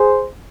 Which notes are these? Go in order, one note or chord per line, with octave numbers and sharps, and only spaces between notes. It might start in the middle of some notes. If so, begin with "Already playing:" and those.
Already playing: G#4 C5